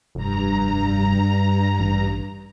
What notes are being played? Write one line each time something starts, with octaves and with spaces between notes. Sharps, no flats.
F1 G2 A#5
A1